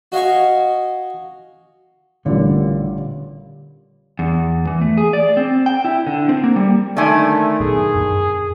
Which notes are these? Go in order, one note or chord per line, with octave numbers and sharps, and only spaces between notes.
F#4 D#5 F5 G#5 C#6
A1 A#2 D3 G3
E2
E3
A3
G#4
D5
C4
G5
E4
D3
C4
A#3
G3
D3 D#3 A3 D5 E5 G#5
A#2 F#3 B3 G#4
F#2